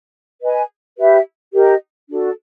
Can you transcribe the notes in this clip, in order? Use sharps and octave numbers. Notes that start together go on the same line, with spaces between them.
B4 D#5 G#5
G4 B4 E5
G4 A#4 D#5
D4 F#4 A4